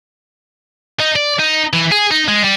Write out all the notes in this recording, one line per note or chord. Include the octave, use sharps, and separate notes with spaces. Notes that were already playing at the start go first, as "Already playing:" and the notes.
D#4
D5
D#4
E3
G#4
D#4
G#3
G3